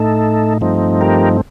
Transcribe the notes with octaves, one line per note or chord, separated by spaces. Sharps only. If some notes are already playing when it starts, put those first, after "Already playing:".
Already playing: A2 A3 D#4 A4
G2 F3 A3 C4 D#4
G4 A#4